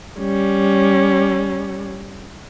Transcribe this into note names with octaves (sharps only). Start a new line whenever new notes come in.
G3 C#4